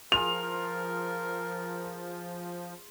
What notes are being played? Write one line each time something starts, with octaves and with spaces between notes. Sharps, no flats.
F3 F4 G#4 A#4 F7